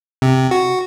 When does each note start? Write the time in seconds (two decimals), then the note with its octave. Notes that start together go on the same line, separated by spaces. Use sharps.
0.22 C3
0.51 F#4